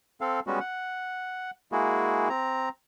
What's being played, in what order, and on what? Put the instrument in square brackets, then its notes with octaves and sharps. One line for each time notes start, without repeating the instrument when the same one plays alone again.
[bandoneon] C4 A4 F5
G3 G#3 B3 C#4 F#4
F#5
G#3 A#3 E4 F#4 G#4
C4 A#5